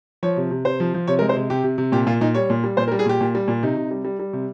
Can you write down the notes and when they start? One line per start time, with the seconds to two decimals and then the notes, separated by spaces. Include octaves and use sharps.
0.23 F3 C#5
0.37 C3
0.51 C3
0.65 C3 C5
0.80 F3
0.94 F3
1.07 C3 C#5
1.19 G#3 A#4
1.29 C5
1.36 C3
1.50 C3 G4
1.64 C3
1.78 C3
1.92 A#2 G4
2.07 A#2 F4
2.21 A#2 D#4
2.35 G3 C#5
2.50 A#2
2.64 G3
2.77 A#2 C5
2.88 A#4
2.92 G3
2.99 G#4
3.06 A#2 G4
3.21 A#2
3.35 G3
3.48 A#2
3.63 C3 D#4
3.77 C3
3.91 G3
4.05 G3
4.19 G3
4.33 C3